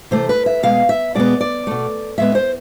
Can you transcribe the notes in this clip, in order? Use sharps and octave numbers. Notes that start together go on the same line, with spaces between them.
C3 E3 A3 C5
B4
E5
B2 G#3 B3 F5
E5
B2 G#3 B3 D5
D5
B2 A3
A2 G#3 B3 E5
C5